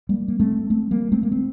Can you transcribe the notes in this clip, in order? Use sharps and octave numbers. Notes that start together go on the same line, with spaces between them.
G3 A#3
A#3
A3 C4
A3 C4
G3 A#3
A3 C4
A#3
A3 C4